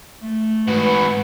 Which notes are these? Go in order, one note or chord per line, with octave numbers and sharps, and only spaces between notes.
A3
G#2 F#4 B4